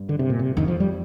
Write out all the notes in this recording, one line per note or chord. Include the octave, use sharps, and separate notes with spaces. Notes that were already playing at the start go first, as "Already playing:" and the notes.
Already playing: G2
D3
C3
A#2
C3
F2 D#3
F3
G3